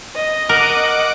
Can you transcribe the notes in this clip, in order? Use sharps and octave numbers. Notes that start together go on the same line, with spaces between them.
D#5
A#4 F#5 D6